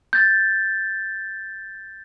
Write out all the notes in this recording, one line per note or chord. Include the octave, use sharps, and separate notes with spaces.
G6 A6